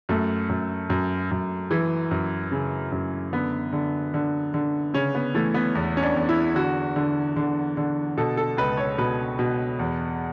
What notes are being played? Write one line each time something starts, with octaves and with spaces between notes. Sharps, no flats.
F#2 A3
F#2
F#2
F#2
E3
F#2
C#3
F#2
D3 B3
D3
D3
D3
C#3 C#4
B3
E3 A3
B3
E2
C#4
D4
E2
E4
D3 F#4
D3
D3
D3
B2 A4
A4
C#2 B4
C#5
B2 B4
B2
E2